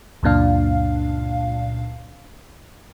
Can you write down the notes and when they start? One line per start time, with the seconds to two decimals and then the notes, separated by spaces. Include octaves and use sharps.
0.23 C#2 F#2 A#2 D4 F5